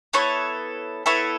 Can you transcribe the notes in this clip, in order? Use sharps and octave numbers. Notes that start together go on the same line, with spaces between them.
B3 E4 A4 C#5
B3 E4 A4 C#5